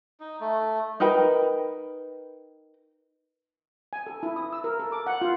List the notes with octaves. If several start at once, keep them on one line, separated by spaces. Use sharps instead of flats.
D#4
A3
D#4 A#4 B4 G5
G#5
A4
E4
D#6
E6
A#4
A4
D6
F#5
F4